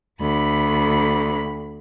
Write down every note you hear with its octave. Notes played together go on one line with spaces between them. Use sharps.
D2 B5